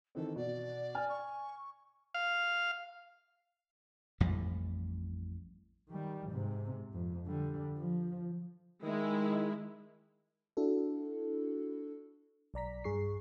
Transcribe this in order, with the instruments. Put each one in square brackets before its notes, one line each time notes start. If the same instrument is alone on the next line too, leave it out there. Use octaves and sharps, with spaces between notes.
[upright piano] D#3 E3 C4 [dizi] A4
[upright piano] B2 [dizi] D5
[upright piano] G#5 F6
[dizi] C#6
[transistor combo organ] F5
[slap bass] A1 F2 A2 G3
[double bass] D#3 G3
G#2 C3
F2
D3 G3
F3
[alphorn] D#3 [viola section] G#3 E4
[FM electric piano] D4 E4 F#4 A4
B1 D5 A#5 B6
G2 G#4 C#6 C7